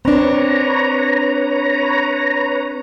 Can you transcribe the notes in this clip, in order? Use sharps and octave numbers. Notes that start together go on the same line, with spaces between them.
C4 D4 B4 C#5 A#5